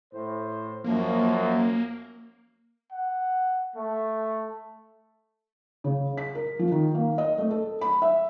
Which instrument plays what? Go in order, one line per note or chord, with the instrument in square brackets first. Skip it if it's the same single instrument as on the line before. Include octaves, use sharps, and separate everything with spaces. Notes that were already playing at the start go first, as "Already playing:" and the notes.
[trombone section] A2 C5
[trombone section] F#2 F3 [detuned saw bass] A#3
[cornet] F#5
A3
[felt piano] C#3
B6
A#4
F3
D#3
A#3
D#5
A3
A4
B5
E5